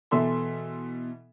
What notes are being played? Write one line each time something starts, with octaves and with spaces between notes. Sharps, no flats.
B2 E3 A4 E5 C6